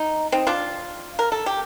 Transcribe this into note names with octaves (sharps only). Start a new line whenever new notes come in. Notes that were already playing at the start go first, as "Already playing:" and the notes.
Already playing: D#4
C4 D#4
D4 F4
A#4
A4
G4